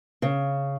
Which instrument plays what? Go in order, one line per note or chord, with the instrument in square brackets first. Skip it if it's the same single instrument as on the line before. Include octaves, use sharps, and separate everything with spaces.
[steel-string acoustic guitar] C#3